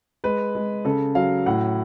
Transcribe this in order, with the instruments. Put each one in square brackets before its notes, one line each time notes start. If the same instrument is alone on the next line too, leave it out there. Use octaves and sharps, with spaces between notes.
[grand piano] G#3 B4
G#3
C#3 A4
F#3 F5
A2 F#5